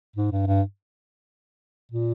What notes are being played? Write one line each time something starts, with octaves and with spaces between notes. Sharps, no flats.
G#2
G2
G2
A#2